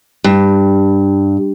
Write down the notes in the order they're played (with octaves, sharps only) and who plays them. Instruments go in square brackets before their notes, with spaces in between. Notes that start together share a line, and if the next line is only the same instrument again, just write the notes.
[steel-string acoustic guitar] G2